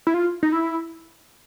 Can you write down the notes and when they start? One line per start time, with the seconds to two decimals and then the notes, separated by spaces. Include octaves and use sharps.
0.07 E4
0.14 F4
0.43 D#4
0.52 E4